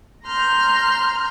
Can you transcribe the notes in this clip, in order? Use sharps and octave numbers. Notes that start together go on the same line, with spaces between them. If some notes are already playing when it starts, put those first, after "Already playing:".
A#5 C6 F6 G6